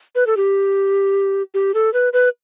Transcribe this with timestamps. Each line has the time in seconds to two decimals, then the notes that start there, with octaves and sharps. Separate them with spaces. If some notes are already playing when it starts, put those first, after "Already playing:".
0.15 B4
0.27 A4
0.37 G4
1.54 G4
1.74 A4
1.94 B4
2.13 B4